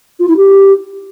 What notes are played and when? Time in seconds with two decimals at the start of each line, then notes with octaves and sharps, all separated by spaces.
0.19 F4
0.28 E4
0.36 G4